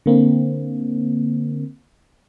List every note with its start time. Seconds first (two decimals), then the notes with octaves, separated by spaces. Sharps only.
0.06 D3 A#3 C4